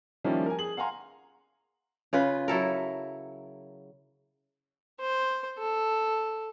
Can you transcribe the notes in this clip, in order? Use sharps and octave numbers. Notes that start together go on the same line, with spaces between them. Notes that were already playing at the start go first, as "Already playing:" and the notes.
D#3 F3 G3 A#3 C#4 E4
A#4 G#5
G#4 F#7
F5 F#5 G#5 A#5 C6
C#3 F4 B4
F#3 E4 A4 A#4
C5
A4